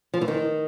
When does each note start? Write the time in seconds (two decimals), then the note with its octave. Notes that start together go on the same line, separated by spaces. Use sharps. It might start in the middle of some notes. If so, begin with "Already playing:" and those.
0.14 F3
0.21 E3
0.28 D#3